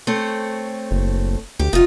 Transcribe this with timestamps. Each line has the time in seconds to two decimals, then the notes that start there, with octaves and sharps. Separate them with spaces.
0.07 A3 C4 C#5
0.91 F#1
1.59 D2 G4
1.73 F1 D#4 F4